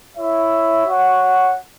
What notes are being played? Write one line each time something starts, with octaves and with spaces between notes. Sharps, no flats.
E4 C#5 E5
F#4 C#5 F#5